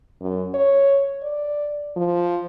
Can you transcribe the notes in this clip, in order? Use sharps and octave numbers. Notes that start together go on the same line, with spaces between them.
F#2
C#5
D5
F3